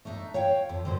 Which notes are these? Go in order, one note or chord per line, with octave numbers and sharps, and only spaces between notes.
A3 D4 D#4 E5
C#5 F5 G5
F2 F3
D3 F#3 A#3 C5